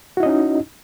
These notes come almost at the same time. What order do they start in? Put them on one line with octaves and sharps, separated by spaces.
F#4 E4 D#5 C#4 D#4